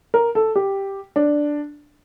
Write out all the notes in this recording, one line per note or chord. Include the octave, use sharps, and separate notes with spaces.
A#4
A4
G4
D4